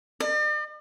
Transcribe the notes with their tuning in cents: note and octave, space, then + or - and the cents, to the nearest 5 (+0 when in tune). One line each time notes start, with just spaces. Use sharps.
D5 +45